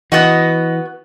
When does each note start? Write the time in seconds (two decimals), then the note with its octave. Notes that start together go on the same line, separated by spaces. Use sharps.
0.12 E3 B3 F#4 D#5 F#5 D#6